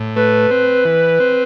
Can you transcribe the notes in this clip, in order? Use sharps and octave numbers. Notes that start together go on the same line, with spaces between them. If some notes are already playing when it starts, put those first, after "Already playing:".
Already playing: A2
A3 B4
C4
E3
C4